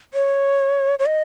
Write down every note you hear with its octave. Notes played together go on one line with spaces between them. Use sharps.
C#5
C#5
D#5